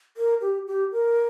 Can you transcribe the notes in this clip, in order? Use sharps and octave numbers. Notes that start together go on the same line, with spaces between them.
A#4
G4
G4
A#4